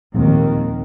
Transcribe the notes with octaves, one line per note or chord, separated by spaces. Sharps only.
D#2 A#2 D#3 F3 G#3 C4